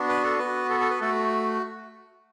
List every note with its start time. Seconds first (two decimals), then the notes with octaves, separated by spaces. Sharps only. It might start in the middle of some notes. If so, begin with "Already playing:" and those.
Already playing: B3 D4 F#4
0.09 B4
0.24 A4
0.39 B3 F#4 B4
0.70 A4
0.80 A4
0.90 B4
1.01 A3 F#4 A4